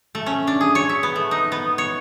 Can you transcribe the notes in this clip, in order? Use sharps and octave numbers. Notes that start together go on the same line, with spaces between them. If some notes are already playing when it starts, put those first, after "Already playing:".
A3
C#4
D4
G#4
C#5
E5
B3
A3
D#4
B3
C#5